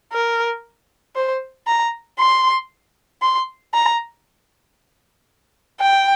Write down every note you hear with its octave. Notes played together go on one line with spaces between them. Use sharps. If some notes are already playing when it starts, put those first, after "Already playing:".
A#4
C5
A#5
C6
C6
A#5
G5